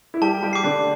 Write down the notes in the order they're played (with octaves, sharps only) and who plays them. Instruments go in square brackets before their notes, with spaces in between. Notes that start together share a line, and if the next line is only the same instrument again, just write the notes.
[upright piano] E4
[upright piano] G3 G4 [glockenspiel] A5
[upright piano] G3 G4
[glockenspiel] D6 C7
[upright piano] D3 D4